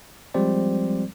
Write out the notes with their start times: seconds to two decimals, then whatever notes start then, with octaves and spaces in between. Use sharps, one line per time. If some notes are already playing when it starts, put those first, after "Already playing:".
0.34 F3 G3 G#3 C4 C5 D5